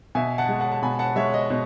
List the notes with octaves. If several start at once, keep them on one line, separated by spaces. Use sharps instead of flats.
B2 E5 G#5
F#5 A5
G#3
F#5 A5
A5
B2 G#5 B5
F#5 A5
G#3 C#5 E5
D#5
B2 D#5